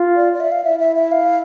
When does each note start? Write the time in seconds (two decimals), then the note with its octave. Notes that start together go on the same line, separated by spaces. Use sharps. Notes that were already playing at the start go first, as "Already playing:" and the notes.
Already playing: F4
0.16 D5
0.33 D5
0.40 E5
0.52 F5
0.64 E4 E5
0.79 E5
0.96 E5
1.11 F5